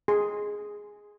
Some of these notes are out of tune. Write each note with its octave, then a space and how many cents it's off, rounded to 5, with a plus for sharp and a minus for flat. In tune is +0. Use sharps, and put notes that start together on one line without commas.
G#4 +0 C6 +0